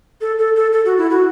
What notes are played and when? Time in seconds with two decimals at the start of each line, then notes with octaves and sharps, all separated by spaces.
0.21 A4
0.38 A4
0.56 A4
0.72 A4
0.85 F#4
0.98 E4
1.11 F#4